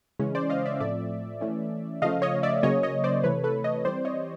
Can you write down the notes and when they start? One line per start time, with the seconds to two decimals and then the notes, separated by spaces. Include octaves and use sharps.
0.19 C#3 E3 G#3 C#4
0.35 C5 D5
0.50 D#5 F5
0.66 D5 E5
0.80 A2 F3 A3 C4 D5 E5
1.41 E3 A3 C#4
2.02 C#3 F3 A3 D#5 F5
2.22 C#5 D#5
2.43 D5 E5
2.63 C#3 F#3 A#3 C#4 C#5 D#5
2.83 C#5 D#5
3.04 C5 D5
3.24 C3 E3 A3 B4 C#5
3.44 A4 B4
3.64 C#5 D#5
3.85 E3 G3 C4 C5 D5
4.05 C#5 D#5